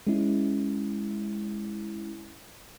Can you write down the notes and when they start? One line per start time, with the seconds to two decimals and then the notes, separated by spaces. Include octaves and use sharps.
0.07 G#3 C#4 E4